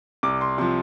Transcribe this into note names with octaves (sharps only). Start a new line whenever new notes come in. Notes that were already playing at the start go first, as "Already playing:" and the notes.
C2 D6
C6
C3 F3 C6